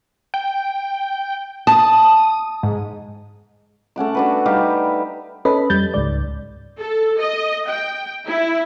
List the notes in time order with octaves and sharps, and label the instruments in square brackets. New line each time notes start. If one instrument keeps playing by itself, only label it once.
[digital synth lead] G5
[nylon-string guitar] A5 [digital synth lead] D#6
[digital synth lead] G#2
[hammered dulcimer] A3 C#4 F#5 D6
D4 F#4 B4
G3 D#4 G4 F5
[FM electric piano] C#4 A4 B4 D#5 B5
F2 G3 G6 A6
C#2 G#2 D5
[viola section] A4
D#5
G5
E4